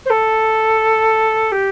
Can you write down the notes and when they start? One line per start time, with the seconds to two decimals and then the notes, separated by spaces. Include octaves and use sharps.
0.05 C5
0.10 A4
1.51 G4